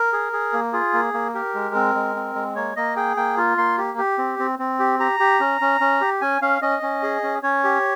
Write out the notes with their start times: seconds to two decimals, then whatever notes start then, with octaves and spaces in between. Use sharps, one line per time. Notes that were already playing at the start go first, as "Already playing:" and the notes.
Already playing: A#4
0.13 G#4
0.33 G#4
0.53 A#3
0.73 F4 G#4
0.93 A#3
1.14 A#3
1.34 G4 A#4
1.54 G#3
1.75 C4
1.95 G#3
2.15 C4
2.35 G#3
2.56 A#3 C#5
2.76 A#3 D#5
2.96 G#4 G5
3.17 A#3 G5
3.37 F4
3.58 A#3 C6
3.78 G4
3.98 G4
4.18 C4
4.39 C4
4.59 C4
4.79 G4
4.99 G4 A#5
5.20 G4
5.40 C#4
5.61 C#4
5.81 C#4
6.01 G4
6.21 C#4 G#5
6.42 C#4 F5
6.62 C#4 D#5
6.82 C#4
7.03 G#4
7.23 C#4
7.43 C#4 C#5
7.64 G4